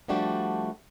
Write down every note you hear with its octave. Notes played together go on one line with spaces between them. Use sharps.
F3 G3 A3 D4 F#4 G4